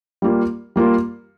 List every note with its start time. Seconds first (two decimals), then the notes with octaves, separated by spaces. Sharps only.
0.22 G3 A#3 F4
0.76 G3 A#3 F4